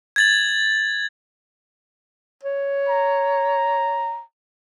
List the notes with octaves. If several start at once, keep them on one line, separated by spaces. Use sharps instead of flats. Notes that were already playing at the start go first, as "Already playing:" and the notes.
G#6 A6 F#7
C#5
A#5